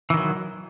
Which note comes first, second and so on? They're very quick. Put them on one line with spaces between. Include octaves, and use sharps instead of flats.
E3 D#3 F#3